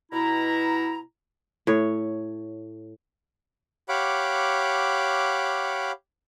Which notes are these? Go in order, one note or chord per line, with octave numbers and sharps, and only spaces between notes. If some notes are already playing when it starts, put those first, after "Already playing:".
B2 E4 A#5
A2 C#5
G4 C#5 F5 F#5 B5 D6